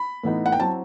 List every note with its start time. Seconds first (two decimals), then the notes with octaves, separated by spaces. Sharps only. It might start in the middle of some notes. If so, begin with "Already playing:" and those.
Already playing: B5
0.23 A2 E3 B3 D#4
0.46 F#5
0.52 G5
0.60 F#3 C4 E4 A5